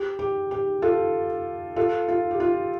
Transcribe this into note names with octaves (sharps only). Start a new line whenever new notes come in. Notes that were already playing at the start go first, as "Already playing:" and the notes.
Already playing: G4
G4
G4
F4 A4
F4 A4
F4
G4
F4